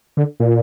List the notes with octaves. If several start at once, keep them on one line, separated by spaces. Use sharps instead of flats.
D3
A#2